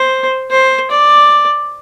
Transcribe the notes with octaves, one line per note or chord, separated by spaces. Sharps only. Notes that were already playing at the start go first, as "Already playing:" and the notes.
Already playing: C5
C5
D5